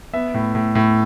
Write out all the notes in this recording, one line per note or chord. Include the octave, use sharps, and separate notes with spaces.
B3 E5
A2
A2
A2